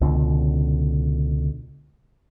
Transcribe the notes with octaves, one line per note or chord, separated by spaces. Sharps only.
C#2 B2 D3